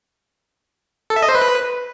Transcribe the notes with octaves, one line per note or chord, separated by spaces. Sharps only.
A4
E5
D#5
C5
B4